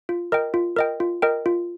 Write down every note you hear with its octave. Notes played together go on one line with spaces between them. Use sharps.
F4
A#4 D#5 G5
F4
A#4 D#5 G5
F4
A#4 D#5 G5
F4